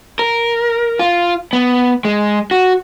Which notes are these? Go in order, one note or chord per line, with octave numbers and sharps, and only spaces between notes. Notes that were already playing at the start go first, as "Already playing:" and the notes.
A#4
F4
B3
G#3
F#4